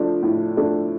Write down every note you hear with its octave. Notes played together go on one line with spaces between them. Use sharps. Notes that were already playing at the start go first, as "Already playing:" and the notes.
Already playing: F3 A3 D4
A2
F3 A3 D4